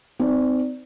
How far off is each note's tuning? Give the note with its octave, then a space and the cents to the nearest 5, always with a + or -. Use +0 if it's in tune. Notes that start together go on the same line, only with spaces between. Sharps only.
C4 -30 D#4 +0 D5 +0